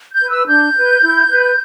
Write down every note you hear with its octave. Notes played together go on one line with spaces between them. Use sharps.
G6
B4
E6
D4 G6
B4
E4
B4